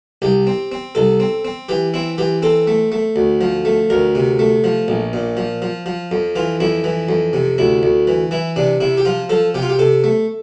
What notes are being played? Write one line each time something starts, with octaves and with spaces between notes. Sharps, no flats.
C2 G4
C4
C4
C2 A4
C4
C4
E3 G4
C4 E4
E3 G4
C4 A4
A3
A3
D2
F3
A3
D2 A#4
C3
A3
F3
A#1
A#2
F3
F3
F3
F2
E3 F4
F2 E4
E3
F2
C3
D2 E4
D2
E3
E3 E4
C3 D4
C3 E4
G4
F3 F4
F3 A4
C3 G4
F4
G4
C3 A4
A3